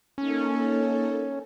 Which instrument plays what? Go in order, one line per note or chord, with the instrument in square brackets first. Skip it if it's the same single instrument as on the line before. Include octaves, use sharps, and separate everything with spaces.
[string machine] A#3 D#4 A4 [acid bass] C#4